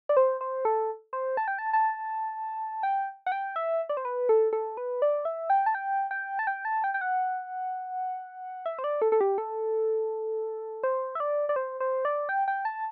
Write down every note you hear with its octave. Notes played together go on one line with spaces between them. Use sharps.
D5
C5
C5
A4
C5
A5
G5
A5
A5
G5
F#5
G5
E5
D5
C5
B4
A4
A4
B4
D5
E5
G5
A5
G5
G5
A5
G5
A5
G5
G5
F#5
E5
C5
D5
A4
A4
G4
A4
C5
E5
D5
D5
C5
C5
D5
G5
G5
A5